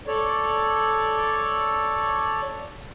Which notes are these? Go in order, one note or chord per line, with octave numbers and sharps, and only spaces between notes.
A4 C#5 D5